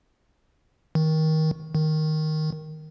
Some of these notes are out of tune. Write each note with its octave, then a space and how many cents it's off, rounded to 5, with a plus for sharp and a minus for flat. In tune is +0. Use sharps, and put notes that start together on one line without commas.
D#3 +20
D#3 +0